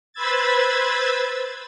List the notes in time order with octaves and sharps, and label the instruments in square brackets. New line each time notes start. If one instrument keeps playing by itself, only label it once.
[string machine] B4 C5 B5 E6 G#6 A6